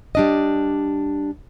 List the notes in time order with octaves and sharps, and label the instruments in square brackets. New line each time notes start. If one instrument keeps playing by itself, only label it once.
[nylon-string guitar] G3 D4 D#5